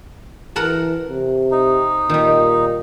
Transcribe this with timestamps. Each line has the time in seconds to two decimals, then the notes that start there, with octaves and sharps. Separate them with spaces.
0.56 E3 A#4 F#5 A5
1.09 C3
1.51 D#4
2.09 A#2 D#3 G3